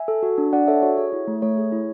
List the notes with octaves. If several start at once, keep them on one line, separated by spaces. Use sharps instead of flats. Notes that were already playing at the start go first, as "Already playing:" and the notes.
Already playing: E5 G#5
A4
F#4
D4
D4 D5 F#5
A4 C#5 E5
F#4 C#5
G#4 C#5
E4
A3
A3 C#5
G#4
E4